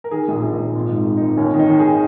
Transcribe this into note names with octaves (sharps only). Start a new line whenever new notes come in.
A#4
D#3 G#4
A#1 G#4
A#1
D#4
A#1
G#1 F4
G#2
D#4
D#3
G#1 D#4
D#2 C#4
D#3
D#4
D#3
G#4